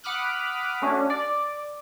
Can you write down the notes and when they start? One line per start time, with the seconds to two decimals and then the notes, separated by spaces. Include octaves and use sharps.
0.04 F#5 B5 D6 D#6 F6 F#6
0.82 A3 C#4 D4 F#4
1.10 D5